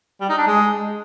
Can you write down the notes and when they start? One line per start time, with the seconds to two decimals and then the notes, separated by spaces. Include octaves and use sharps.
0.21 G3
0.29 D#4
0.38 D4
0.46 G#3